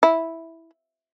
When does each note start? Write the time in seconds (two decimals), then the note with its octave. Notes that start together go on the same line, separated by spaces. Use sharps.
0.03 E4